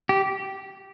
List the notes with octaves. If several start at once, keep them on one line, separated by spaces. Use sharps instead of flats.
G4